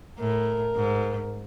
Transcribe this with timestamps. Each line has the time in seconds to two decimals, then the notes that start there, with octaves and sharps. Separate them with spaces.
0.19 A2 A#4
0.76 G#2